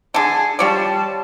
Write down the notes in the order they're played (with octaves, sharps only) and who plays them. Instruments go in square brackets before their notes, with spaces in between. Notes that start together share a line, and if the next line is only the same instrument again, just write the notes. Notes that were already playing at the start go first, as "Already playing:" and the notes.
[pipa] D3 A5 [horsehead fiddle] G#4
[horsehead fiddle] G3 A5 [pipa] F4 C#5 D5